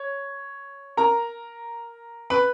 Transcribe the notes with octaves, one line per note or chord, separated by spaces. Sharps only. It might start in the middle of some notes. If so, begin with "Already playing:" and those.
Already playing: C#5
A#4 A#5
B4 B5